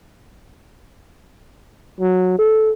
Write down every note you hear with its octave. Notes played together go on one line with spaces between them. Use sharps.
F#3
A4